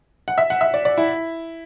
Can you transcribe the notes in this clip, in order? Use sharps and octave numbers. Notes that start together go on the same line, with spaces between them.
F#5
E5
F#5
E5
D5
D5
E4